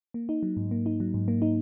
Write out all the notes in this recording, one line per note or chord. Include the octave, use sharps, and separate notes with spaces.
A#3
D#4
F#3
G#2
A#3
D#4
F#3
G#2
A#3
D#4